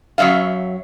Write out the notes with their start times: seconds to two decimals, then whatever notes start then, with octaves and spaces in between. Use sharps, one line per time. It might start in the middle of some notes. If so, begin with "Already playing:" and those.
0.18 F#2 F#3 G#3 E5 F5